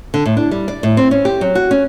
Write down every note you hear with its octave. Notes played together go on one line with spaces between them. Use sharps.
D3
A2
D4
G3
D5
A2
C4
C#4
G4
F#3
F#4
C#4